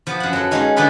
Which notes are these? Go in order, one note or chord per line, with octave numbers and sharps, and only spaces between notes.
F3 B3
F#2 F#5
F#3 A4
G#3 C#4 D#4 F5
D3 F3 B3 D#4 F4 B4